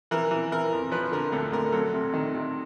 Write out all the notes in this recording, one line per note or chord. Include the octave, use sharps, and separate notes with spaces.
E3 A#4
E3
E3 A#4
F2
F3 B4
D3 A#4
D2 A4
D2 A#4
F#3 A4
C3
D#3
C3